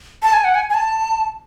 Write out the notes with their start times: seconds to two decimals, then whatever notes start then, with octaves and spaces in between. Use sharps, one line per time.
0.23 A5
0.33 G#5
0.44 F#5
0.55 G#5
0.70 G#5
0.74 A5